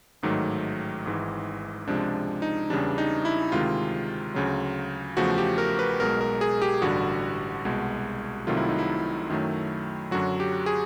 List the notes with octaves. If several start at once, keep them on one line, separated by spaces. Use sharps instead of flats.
A1 G#2 D#3 F#3 A3
G#1 G#2 E3
C#2 C3 F3 G#3 D4
D#4
E2 C#3 E3 G3 D4
D#4
E4
D2 C3 D#3 G#3 F4
D2 C#3 F#3
E2 C#3 F3 A3 F#4
G4
A#4
B4
B1 B2 G#3 A#4
A#4
G#4
G4
A1 G2 D3 G3 F#4
C2 B2 G#3
C2 C3 D#3 F#3 A3 F4
E4
D#4
E4
F#2 D#3 F#3 A3
F#2 D3 F#3 F#4
G4
G#4